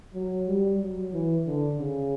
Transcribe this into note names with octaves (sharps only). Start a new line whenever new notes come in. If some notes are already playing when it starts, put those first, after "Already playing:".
F#3
G3
F#3
E3
D3
C#3